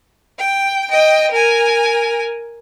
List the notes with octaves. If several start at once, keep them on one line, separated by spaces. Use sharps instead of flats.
G5
D#5 G5
A#4 G#5